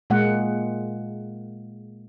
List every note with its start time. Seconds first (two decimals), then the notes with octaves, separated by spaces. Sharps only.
0.10 A#2 G#3 A#3 F#5